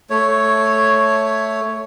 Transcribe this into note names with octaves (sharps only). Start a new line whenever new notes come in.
A3 C#5